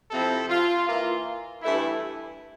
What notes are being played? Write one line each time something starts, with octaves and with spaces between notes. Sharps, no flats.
C3 F3 C4 E4 A4
F4
E3 A#3 F4
G2 E3 A3 E4